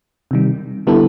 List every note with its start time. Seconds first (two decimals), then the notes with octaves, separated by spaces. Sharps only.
0.31 C3 D#3 G3
0.87 D3 G3 B3 E4 A4